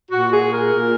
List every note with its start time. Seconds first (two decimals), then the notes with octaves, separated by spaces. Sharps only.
0.11 A#2 F#4
0.32 G#4
0.52 A#4
0.72 A#2